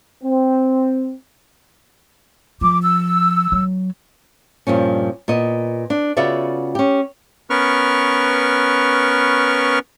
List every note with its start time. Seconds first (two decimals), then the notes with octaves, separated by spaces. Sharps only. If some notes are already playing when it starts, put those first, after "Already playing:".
0.23 C4
2.61 F3 D6
2.81 E6
3.52 F#3
4.67 G2 A#2 F3 C#4
5.28 A#2 B3 D#5
5.90 D4
6.17 C#3 B3 F4 F#4 D5 E5
6.75 C#4 G4
7.50 B3 C#4 A#4 B4 C#6 F6